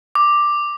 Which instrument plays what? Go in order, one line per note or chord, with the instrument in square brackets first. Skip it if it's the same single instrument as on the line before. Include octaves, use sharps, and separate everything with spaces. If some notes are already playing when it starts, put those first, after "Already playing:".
[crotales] D6